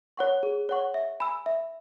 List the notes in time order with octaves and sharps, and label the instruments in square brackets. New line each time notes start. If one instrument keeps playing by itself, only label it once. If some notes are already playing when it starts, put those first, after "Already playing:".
[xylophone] C#5 F#5 C#6
G#4
C#5 F#5 C#6
E5
G#5 B5 E6
E5